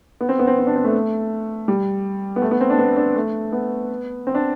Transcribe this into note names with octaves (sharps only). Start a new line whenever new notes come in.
B3
C4
B3
C4
C4
D4
C4
A3
G3
B3
A3
B3
C4
D4
B3
D4
A3
B3
C4
D4